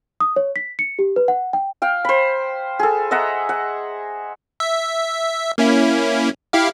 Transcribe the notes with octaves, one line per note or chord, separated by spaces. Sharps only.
D#6
C#5
B6
C#7
G4
B4
F#5
G5
F5 G5
C5 B5
G#4 A4
D#5 E5 F#5 A#5
F#5
E5
A#3 C#4 E4
E4 G4 F5